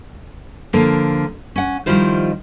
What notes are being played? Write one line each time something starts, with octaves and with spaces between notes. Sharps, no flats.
D3 F3 A#3
C#4 F#5
D#3 F3 G3 E4 F4 C5